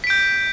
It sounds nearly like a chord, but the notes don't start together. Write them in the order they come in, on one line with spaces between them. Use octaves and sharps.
B6 D7 G6